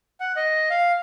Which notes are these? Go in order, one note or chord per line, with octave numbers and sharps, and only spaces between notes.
F#5
D#5
F5